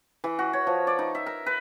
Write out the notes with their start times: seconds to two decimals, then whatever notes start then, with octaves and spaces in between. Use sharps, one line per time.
0.24 E3
0.39 F#4
0.53 C#5
0.67 F3
0.87 D5
0.99 D#4
1.15 E5
1.26 A#4
1.46 B4